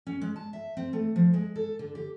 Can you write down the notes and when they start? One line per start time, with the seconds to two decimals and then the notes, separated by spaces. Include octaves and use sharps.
0.07 C#4
0.21 G#3
0.36 A5
0.53 E5
0.77 C4
0.93 A3
1.16 F3
1.34 G#3
1.56 A4
1.79 D3
1.95 G4